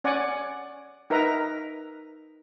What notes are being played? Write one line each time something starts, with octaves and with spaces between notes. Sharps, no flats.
C#4 D5 F#5 G#5
D#4 A#4 B4 E5 A#5